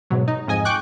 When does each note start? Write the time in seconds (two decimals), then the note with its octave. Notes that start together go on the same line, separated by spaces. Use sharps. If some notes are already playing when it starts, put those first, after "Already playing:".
0.10 G#2 B2 F#3
0.28 D#4
0.48 F2 G#2 D#5 G#5
0.65 G5 C#6 D6 F#6